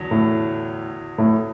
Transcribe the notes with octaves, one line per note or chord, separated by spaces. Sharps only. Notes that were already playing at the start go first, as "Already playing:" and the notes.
Already playing: E2 D3 F#3
A2
A2